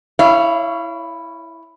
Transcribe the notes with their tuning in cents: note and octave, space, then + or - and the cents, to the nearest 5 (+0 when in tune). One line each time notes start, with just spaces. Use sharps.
E4 +0 C#5 +10 F5 -35